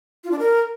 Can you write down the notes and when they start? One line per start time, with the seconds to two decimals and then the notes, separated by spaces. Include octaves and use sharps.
0.24 F4
0.31 D4
0.39 A#4